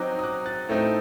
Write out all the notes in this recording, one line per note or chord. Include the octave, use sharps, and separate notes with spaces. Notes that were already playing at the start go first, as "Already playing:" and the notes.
Already playing: F#3 C4 D#4 D6 F#6
D#6
D6 F#6
F#6 A6
A2 A3 C4 D#4